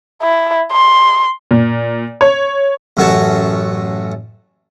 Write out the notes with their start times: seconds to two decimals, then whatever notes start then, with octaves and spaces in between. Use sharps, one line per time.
0.22 E4
0.72 C6
1.51 A#2
2.21 C#5
2.97 A1 F#2 A3 F#4 C#5 A5